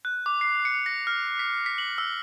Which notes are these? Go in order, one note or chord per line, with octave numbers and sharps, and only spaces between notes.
F#6
D6
C7
C#7
A#6
F6
B6
B6
F#7
E6